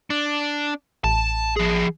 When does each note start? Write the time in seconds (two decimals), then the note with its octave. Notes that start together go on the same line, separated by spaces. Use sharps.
0.10 D4
1.04 A1 A5
1.57 F3 G#4